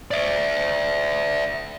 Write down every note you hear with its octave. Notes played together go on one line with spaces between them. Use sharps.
D5 E5